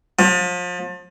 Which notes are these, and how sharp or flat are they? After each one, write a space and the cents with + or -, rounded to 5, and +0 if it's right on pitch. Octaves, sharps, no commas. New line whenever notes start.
F3 +35